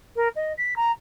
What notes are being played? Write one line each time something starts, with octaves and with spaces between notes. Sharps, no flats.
A#4
D#5
B6
A#5